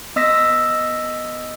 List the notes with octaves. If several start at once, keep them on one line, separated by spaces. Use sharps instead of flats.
B3 D#5 D#6 E6 A#6 B6